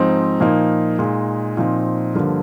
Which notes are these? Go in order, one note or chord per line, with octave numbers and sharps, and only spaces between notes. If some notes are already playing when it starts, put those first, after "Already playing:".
Already playing: G#2 F3 C4 D#4
A#2 F3 A#3 D#4
A#2 G#3 D#4
A#2 F3 C4 D#4
G2 D3 F3 A#3